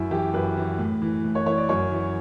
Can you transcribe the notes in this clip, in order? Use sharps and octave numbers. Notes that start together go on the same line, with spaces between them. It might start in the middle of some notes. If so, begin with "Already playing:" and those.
Already playing: F#2 E4
E3 G4
F#2 B4
E3
A2
E3
A2
C#5
E3 C#5
D5
F#2 C#5
E3